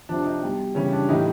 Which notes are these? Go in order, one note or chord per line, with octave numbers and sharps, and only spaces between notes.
C3 F3 D4
D#4
B2 G3
C#3 E3 G3 C#4
D4
A2 E3 G3 D#4